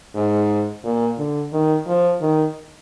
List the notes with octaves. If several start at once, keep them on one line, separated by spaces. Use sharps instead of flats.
G#2
A#2
D3
D#3
F3
D#3